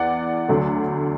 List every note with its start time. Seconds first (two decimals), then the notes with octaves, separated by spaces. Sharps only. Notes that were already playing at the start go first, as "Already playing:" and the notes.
Already playing: E2 E3 D5 F#5
0.48 D2 D3 F#3 A3